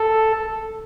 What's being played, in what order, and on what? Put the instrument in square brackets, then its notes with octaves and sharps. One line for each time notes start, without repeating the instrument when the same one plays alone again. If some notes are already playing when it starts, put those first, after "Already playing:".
Already playing: [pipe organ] A4